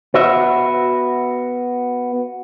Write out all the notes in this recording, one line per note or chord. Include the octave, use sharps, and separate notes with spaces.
B3 F#4 E5